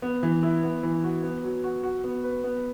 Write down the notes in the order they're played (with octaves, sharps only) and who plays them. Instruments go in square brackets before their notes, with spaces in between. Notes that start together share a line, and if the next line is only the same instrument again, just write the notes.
[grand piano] B3
E3
E4
B3
E3
F#4
B3
F#3
F#4
F#4
B3
B4
B3